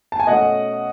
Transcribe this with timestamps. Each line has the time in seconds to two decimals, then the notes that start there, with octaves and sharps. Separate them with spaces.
0.12 A5
0.20 G#5
0.27 B2 A3 C#4 D#5 F#5